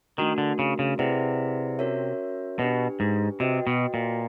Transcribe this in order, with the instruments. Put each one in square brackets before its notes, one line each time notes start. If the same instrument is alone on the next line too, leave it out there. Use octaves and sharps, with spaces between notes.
[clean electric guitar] D#3 [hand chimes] A3 D4 F#4 A#4
[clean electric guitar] D3
C#3
C#3
[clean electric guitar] C3 [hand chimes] E4 G#4 B4 D5 F#5
[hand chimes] C#4 F#4 A#4 C#5 E5
[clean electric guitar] B2 [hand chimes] D4 G4 B4
[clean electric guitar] G#2
[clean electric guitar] C3 [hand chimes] F#4 B4 D#5 G5
[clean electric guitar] B2
A#2